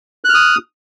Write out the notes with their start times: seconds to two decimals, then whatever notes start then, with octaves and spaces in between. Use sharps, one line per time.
0.25 F#6
0.29 F6
0.34 D#6